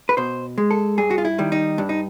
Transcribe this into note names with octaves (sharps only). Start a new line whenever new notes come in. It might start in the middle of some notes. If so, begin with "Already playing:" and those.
B4
B2 C5
G#3
A4
G2 G#4
F#4
F4
E4
D#3 G3
D#4
G2 D4
D#4